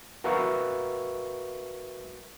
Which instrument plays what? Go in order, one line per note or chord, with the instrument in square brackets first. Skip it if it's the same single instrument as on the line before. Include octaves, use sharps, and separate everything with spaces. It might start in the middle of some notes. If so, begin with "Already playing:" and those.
[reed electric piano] F#4 A#4 B4 E5 F5 C#6